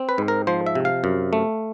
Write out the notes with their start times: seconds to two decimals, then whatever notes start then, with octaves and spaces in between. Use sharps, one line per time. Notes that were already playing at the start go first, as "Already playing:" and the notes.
Already playing: C4
0.09 B4
0.18 G#2
0.28 A#4
0.47 F3 C5
0.66 E5
0.75 C3
0.85 F5
1.04 F#2
1.33 A3